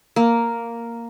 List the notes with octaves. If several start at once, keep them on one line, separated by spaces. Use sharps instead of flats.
A#3